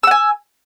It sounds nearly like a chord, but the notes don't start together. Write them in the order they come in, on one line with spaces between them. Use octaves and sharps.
E6 F#5 G#5